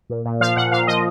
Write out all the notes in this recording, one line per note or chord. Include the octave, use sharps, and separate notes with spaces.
A#2
A#2
F3 F5
A#2 F#5
A#2 F5
F3 D#5